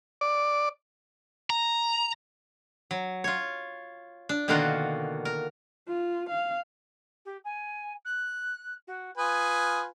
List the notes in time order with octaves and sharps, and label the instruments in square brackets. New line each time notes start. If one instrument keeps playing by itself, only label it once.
[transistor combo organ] D5
[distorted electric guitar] A#5
[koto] F#3
F4 C#5
D4
B2 D3 D#3 A#3 F4 F#4
A#4
[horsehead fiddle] F4
F5
[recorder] G4
G#5
F#6
F#4
[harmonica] F4 B4 G#5 [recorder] D#6